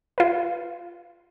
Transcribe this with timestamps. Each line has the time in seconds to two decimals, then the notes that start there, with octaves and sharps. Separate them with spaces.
0.18 F4 B4